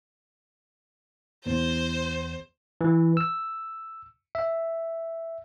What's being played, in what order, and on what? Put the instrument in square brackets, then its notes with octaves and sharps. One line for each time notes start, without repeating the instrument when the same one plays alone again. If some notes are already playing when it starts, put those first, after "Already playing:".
[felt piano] E2 [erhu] C5
[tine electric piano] E3
E6
E5